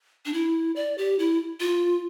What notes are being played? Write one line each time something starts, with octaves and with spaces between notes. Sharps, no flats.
D4
E4
D5
G4
E4
F4